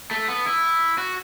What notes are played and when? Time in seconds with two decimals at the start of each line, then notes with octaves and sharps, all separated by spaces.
0.11 A3
0.28 B3
0.46 E4
0.98 F#4